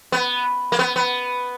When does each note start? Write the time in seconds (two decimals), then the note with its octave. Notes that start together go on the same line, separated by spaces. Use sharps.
0.12 B3
0.72 A#3
0.79 B3
0.96 B3